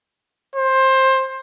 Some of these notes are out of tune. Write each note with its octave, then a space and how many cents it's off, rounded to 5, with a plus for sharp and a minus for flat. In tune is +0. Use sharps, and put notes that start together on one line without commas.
C5 +20